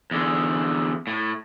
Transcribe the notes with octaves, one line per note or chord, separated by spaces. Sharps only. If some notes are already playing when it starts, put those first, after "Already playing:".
E2 D3
A2